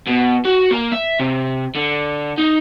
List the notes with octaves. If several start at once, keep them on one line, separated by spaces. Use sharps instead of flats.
B2
F#4
A#3
E5
C3
D3
D#4